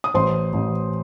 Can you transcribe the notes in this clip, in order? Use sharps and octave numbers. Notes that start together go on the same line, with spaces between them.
D#6
A1 C5 C6
A1